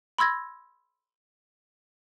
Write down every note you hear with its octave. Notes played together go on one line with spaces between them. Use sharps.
B5 C6 E6 G#6 A#6